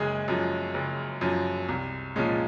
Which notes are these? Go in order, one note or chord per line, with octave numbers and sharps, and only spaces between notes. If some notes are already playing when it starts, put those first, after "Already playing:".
Already playing: F#1 G#3 G#4
F#2 F3
F#1
F#2 F3
C2
A#2 F3 G#3 C#4